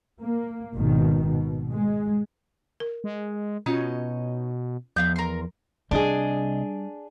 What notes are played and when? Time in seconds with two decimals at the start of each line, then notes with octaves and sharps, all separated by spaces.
0.20 A#3
0.74 G#1 B2 D#3
1.27 B2
1.72 G#3
2.80 A#4
3.04 G#3
3.66 B2 C#4 D#4 F4 C#5 D#5
4.96 E2 F3 B3 F5 G6
5.16 A#4 C6
5.91 C2 G3 D4 G#4 D#5